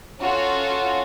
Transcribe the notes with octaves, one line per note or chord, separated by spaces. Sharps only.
C#4 F4 F#4 A4